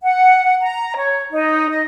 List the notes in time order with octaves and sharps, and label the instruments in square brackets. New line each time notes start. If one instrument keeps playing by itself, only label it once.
[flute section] F#5
A#5
C#5
D#4
D#5